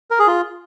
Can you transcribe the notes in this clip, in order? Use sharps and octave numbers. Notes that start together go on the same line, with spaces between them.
A#4
G#4
F4